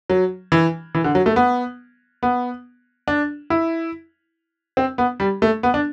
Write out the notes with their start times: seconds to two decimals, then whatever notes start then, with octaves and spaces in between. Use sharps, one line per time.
0.10 F#3
0.52 E3
0.95 E3
1.04 D3
1.15 F#3
1.26 A3
1.36 B3
2.23 B3
3.08 D4
3.50 E4
4.77 C4
4.98 B3
5.20 G3
5.42 A3
5.63 B3
5.74 D4